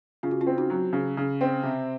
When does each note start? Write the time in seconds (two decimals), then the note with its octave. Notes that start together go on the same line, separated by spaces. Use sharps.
0.23 C#3 F4
0.31 F#4
0.41 C#4 F4
0.47 C4
0.58 D#4 F#4
0.70 F#3
0.93 C#3
1.17 C#3
1.41 C4
1.63 C3